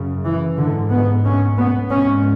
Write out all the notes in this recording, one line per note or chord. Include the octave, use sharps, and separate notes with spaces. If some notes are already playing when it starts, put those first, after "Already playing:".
Already playing: F#2 C#3
E3
G#2 D3
B3
C#4
B3
G#2 C#4